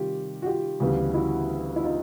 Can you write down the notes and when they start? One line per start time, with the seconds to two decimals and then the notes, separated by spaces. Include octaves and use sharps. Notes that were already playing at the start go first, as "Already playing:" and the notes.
Already playing: C3 D#3 G3 F4 G4
0.42 F#4
0.46 F4 G4
0.80 D2 C#3 E3 G3 B3
1.14 E4 F#4
1.76 E4
1.83 D#4 F4